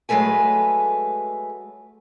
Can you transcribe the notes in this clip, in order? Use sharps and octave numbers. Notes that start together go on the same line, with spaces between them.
F#3 G#3 A3 B4 G#5